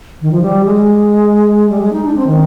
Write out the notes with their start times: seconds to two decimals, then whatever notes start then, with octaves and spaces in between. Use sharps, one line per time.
0.21 D#3
0.32 F3
0.42 G3
0.65 G#3
1.69 G3
1.81 G#3
1.93 D#4
2.05 D4
2.16 C4
2.27 D#3